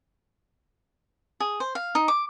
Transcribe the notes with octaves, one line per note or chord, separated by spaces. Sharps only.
G#4
C5
F5
D#4
D6